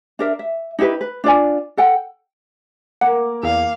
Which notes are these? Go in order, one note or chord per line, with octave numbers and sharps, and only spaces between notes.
D4 A#4 E5
E5
D#4 E4 G4 B4
B4
D4 F4 D5 G#5
A4 F#5 G5
A#3 F#5
E2 F5